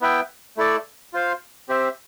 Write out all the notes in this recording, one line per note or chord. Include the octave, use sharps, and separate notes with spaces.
B3 E4 B4 E5 G5
A3 E4 A4 D5
F4 C5 F5
C4 G4 C5 E5